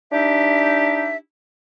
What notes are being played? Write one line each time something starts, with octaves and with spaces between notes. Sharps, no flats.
D4 D#4 G4 E5